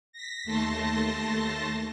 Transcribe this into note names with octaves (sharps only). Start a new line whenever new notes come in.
A#6 B6
D#2 A3 A5 C6 A#6